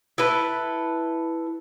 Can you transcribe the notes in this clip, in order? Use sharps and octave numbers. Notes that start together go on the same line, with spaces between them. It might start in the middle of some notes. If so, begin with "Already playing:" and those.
E4 A4 B4